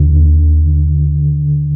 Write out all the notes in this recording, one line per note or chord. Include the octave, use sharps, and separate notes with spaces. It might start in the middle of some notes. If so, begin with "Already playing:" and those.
Already playing: D#2 D3